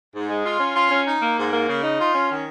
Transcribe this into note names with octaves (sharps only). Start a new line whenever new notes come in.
G#2
G#3
F4
C#4
F4
C#4
D#4
A#3
G#2
A#3
C#3
D#4
F4
C#4
D#3